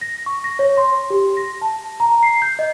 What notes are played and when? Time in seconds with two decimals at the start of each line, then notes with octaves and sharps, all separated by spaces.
0.01 A#6
0.26 C#6
0.44 A#6
0.59 C#5
0.77 C6
1.10 G4
1.37 A#6
1.62 A5
2.00 A#5
2.23 C7
2.42 G6
2.59 D#5